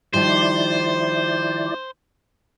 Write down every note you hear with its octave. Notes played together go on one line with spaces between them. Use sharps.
D#3 F3 G3 E4 C5 D5